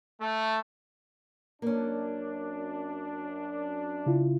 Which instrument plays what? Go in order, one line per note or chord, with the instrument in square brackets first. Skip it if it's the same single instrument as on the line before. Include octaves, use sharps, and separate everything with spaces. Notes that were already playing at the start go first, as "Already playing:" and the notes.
[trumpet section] A3
[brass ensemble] F#2 D4 [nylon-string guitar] A#3 C#4
[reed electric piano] C#3 E4 F4